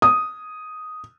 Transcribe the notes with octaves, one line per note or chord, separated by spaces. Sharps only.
D#6